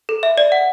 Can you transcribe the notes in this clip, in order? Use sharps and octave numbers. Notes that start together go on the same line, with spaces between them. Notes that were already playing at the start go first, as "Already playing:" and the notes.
A4
E5
D5
F#5